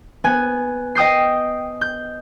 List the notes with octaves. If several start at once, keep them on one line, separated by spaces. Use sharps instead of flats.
B3 G#5
D#5 G5 D#6 G6 C7
G6